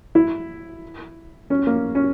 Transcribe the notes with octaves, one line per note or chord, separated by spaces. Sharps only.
E4
C#4
A#3
C#4